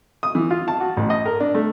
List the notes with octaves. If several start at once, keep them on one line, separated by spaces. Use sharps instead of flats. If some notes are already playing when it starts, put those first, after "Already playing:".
D#6
E3
F4
A5
F#4
A1
D#5
A#4
D4
A3